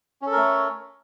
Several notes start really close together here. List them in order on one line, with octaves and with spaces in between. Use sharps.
C#4 A4 A#4 A3 C#5